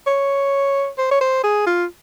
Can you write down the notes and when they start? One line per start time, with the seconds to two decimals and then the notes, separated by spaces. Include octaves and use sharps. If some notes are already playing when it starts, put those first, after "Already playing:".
0.07 C#5
0.98 C5
1.11 C#5
1.21 C5
1.43 G#4
1.66 F4